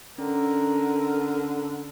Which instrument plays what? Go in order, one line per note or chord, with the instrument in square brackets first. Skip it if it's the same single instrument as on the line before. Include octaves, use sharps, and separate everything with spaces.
[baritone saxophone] D3 [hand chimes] C#4 [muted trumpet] A#4